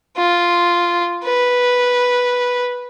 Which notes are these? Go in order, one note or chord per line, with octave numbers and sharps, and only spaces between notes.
F4
B4